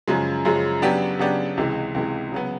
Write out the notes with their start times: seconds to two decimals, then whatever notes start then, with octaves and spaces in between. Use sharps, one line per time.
0.08 F#2 C#3 F3 G#3
0.45 F#2 C#3 F3 G#3
0.82 C#3 F#3 B3 D4 G4
1.19 C#3 F#3 B3 D4 G4
1.57 C#2 C3 E3 G#3
1.94 C#2 C3 E3 G#3
2.32 C#3 F#3 B3